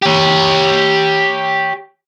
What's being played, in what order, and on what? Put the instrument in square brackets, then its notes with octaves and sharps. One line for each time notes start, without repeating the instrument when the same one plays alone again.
[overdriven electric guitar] G4 C#5